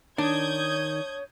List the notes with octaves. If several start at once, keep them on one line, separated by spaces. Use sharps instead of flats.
D#3 D4 C#5 D#6 G6 G#6